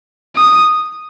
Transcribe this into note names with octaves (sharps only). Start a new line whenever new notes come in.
D#6